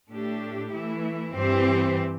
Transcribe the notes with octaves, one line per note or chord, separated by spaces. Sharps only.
A2 A3 D4 G4
E3 A3 E4
G2 E3 C4 G4 C5